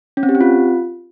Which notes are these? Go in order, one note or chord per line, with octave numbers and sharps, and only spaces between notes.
C#4
C4
G4
C4
F4